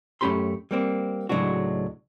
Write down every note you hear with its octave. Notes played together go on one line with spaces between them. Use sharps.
F#2 A3 C#4 G4 B5 C6
G3 A#3 C4
C#2 A2 F#3 G#3 D4 F#4